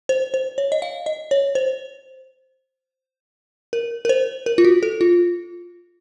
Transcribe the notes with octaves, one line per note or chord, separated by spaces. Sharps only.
C5
C5
C#5
D#5
F5
D#5
C#5
C5
A#4
A#4
C5
A#4
F4
F#4
A4
F4